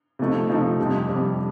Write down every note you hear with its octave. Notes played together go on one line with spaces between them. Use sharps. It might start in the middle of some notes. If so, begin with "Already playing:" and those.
C3 F3 A3 D#4
C3 F3 A3 D#4
F2 C3 G3
F2 C3 G3